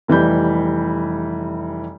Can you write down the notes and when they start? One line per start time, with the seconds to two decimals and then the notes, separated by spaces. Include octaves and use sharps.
0.08 F1 E3 G3 B5 G6